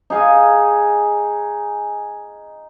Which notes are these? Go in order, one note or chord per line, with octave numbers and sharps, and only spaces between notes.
D#4 G#4 F5 G#5